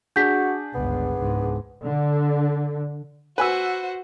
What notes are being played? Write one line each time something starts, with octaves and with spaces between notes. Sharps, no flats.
D4 F#4 G#4 G6 B6
G1 C#2 B3
C#2 G#2
D3
F#4 B4 C5 G#5 E6